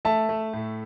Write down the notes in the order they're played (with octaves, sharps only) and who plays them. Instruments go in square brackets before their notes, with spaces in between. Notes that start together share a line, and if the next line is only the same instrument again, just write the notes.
[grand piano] A3 [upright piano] E5 A5
[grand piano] A3
A2